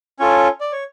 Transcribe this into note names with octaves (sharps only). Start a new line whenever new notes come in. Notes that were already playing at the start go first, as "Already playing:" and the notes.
C#4 F4 A4 C#5
D5
C#5